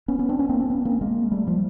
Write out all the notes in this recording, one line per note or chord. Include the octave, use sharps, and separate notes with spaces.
B3 C#4
B3 C#4
C4 D4
B3 C#4
A#3 C4
C4 D4
B3 C#4
A#3 C4
G#3 A#3
G3 A3
F3 G3